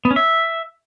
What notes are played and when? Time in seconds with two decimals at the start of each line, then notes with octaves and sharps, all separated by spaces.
0.05 B3
0.11 C#4
0.16 E5